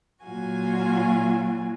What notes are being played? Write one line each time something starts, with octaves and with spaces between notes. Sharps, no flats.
A#2 F#3 F4 F#4 G#5